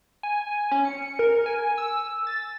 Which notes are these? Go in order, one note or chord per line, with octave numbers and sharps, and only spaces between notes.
G#5
C#4
C#7
A#4
G#5
E6
A6